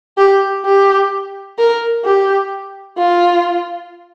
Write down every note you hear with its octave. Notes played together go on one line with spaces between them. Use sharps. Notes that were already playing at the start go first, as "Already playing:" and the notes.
G4
G4
A#4
G4
F4